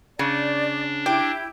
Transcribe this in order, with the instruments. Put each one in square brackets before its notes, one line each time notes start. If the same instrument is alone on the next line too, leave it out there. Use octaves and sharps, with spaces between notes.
[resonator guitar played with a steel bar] C#3 [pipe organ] D4 [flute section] D5
[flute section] E4 G5 [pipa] G4